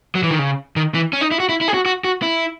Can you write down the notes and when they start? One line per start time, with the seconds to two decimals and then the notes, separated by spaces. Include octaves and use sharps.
0.15 F#3
0.23 E3
0.31 D#3
0.39 C#3
0.76 D#3
0.94 E3
1.13 C#4
1.21 D#4
1.31 E4
1.40 F#4
1.49 E4
1.61 E4
1.68 G#4
1.74 F#4
1.86 F#4
2.04 F#4
2.22 E4